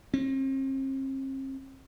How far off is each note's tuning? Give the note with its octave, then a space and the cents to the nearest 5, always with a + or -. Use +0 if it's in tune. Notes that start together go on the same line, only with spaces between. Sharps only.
C4 +45